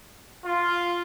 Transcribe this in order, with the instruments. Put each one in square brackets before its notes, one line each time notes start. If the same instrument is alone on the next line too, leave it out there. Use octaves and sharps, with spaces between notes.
[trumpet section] F4